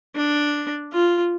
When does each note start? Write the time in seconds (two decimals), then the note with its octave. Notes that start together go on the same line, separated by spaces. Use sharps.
0.15 D4
0.93 F4